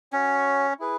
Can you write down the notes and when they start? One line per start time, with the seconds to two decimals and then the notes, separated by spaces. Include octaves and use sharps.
0.12 C#4 F#4 C#5 G#5
0.79 E4 G#4 B4